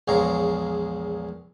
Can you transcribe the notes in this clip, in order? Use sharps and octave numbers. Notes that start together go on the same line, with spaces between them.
A#1 E2 G#3 C#5 F5 A#5